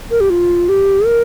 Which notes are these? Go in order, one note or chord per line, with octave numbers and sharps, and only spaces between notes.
A#4
G4
F4
G4
A#4